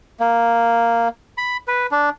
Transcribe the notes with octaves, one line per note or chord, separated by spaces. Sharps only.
A#3
B5
B4
D4